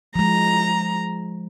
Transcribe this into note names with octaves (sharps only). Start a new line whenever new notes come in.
F3 G#3 A#5